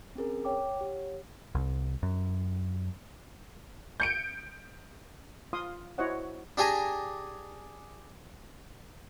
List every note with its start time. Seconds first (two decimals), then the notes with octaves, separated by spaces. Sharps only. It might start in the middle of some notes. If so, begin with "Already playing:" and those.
0.15 C4 C#4 G#4 A#4
0.45 C#5 G5 D6
0.77 G4 C#5 F#5
1.55 C2
2.03 F#2
4.00 G6 C#7 D7
5.53 F4 F5 C6 D#6
5.98 E4 F#4 C5 C#5 D#5 F#5
6.57 D4 G4 G#4 G#5 A#5